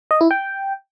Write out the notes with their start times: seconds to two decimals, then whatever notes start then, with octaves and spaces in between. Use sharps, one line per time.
0.11 D#5
0.21 E4
0.31 G5